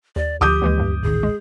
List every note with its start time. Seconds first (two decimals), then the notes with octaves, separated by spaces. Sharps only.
0.16 D#2 D5
0.41 D2 F3 G4 D6 D#6 G6
0.62 D#2 E3 G#3
0.77 E2 G2
1.03 D#1 A1 D#3 G#4
1.23 G#3